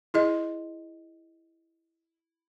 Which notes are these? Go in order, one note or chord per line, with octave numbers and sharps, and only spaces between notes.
E4 G#4 D#5